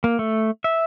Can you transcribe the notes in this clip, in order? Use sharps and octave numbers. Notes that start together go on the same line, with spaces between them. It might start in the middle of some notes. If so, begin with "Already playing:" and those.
A#3
A3
E5